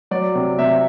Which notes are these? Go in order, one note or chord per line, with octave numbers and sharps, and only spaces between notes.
F#3 D5
C3
C3 E5